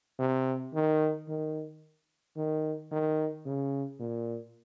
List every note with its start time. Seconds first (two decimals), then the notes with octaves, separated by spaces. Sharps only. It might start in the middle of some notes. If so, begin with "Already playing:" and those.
0.19 C3
0.74 D#3
1.28 D#3
2.37 D#3
2.91 D#3
3.46 C#3
4.00 A#2